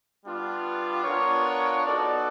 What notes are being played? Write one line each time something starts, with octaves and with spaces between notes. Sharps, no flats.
G3 B3 D4 F4
B3 D4 F4 A#4 C#5
B3 D#4 F#4 A4 D5